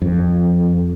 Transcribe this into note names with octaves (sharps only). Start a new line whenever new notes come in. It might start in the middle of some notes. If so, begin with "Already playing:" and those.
F2